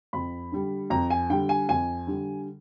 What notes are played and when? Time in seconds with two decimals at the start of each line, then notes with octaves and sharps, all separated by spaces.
0.13 F2 B5
0.52 D3 G3
0.90 F2 A#5
1.10 G#5
1.30 D3 G3 G5
1.49 G#5
1.69 F2 G#5
2.07 D3 G3